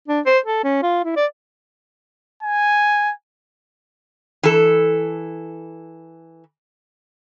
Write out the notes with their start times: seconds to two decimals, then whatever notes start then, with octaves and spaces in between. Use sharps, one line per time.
0.08 D4
0.26 C5
0.46 A4
0.64 C#4
0.83 F4
1.04 E4
1.17 D5
2.43 G#5
4.43 E3 A4